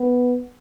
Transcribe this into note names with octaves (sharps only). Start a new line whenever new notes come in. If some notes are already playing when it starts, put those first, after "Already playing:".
Already playing: B3